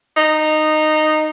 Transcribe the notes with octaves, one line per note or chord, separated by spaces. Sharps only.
D#4